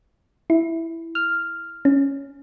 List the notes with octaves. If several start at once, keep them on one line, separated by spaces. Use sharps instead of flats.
E4
F6
C#4